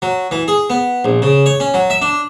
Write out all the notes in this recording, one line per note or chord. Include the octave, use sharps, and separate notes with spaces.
F#3
E3
G#4
B3
A#1
C#3
C#5
C#4
F#3
E5
D4